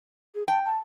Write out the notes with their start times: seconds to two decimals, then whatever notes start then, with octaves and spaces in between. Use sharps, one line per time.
0.35 G#4
0.48 G5 A5
0.65 A5